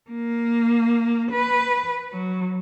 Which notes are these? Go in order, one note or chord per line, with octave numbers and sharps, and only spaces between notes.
A#3
B4
F#3